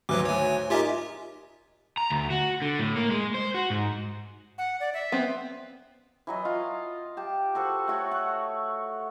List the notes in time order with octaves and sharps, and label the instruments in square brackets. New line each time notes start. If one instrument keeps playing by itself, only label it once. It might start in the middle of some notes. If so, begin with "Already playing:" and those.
[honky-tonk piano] G#1 D2 [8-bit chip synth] F#3 B4 D6
[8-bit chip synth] C#5 G#5
[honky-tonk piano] D#4 A#4 G#5 [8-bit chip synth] F4 G4 E5
[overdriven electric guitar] A#5
D2
F#4
D3
A2
A#3
G#3
C5
F#4
G#2
[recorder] F#5
D5
E5
[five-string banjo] B3 C4
[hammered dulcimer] E3 F#3 D#5
F4
G4 A5
F#4 A4 C5
A3 F#4 C#5
F#5